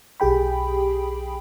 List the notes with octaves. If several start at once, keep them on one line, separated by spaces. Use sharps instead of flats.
B1 G4 G#4 G5 B5